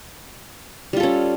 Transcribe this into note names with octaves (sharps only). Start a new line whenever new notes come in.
G3 C#4 F4 A4